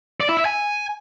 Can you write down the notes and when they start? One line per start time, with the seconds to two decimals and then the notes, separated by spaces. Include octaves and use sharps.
0.20 D5
0.29 E4
0.37 E5
0.45 G#5